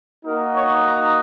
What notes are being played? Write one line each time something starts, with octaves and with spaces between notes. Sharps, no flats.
A#3 D#4 F#4 A#4
C#5
A#5